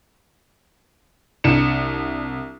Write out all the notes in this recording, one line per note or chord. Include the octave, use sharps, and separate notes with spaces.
C2 D4 C#7 E7